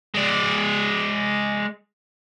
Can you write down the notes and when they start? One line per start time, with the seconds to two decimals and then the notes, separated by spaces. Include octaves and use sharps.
0.14 G#3 D5